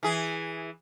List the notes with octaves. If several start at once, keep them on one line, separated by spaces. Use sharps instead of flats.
E3 G#4